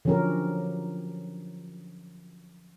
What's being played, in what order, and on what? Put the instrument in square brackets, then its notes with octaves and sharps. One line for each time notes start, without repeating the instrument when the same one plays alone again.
[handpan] D3 F3 F#3 C#4 G4 A#4